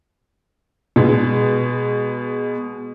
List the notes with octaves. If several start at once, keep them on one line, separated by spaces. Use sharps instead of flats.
B2 G#3